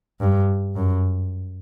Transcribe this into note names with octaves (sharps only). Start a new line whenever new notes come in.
G2
F#2